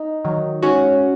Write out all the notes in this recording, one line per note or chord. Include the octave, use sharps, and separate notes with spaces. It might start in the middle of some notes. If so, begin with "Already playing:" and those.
Already playing: D#4
D#3 F#3
G#2 C#4 F#4